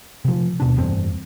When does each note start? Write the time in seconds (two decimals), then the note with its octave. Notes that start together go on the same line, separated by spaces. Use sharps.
0.25 C3 F3
0.60 D#2 B2 D4
0.76 F1 E2 G2 C4